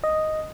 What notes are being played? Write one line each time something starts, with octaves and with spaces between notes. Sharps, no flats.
D#5